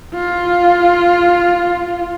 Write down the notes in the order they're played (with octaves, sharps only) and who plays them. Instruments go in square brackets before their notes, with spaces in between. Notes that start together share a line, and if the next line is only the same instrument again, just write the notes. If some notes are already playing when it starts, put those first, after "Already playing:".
[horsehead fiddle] F4